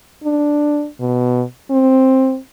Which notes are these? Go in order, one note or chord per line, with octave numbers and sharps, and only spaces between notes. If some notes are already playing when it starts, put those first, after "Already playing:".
D4
B2
C4